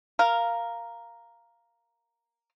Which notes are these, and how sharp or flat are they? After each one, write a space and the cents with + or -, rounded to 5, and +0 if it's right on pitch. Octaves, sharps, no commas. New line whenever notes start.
A#4 +0 F5 -5